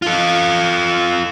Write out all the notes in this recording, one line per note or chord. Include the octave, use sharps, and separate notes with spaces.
F4 A4